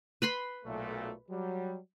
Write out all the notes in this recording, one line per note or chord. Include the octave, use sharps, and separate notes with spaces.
B4 B5 C6
B1 A#2 A3
F#3 G3